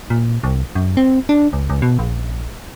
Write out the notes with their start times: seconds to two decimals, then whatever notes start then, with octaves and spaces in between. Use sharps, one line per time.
0.10 A#2
0.43 C2
0.75 F#2
0.97 C4
1.29 D4
1.53 C#2
1.70 C#2
1.82 B2
1.99 A#1